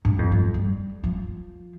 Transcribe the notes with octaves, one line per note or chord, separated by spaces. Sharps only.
G2
F2
G2
G3
F3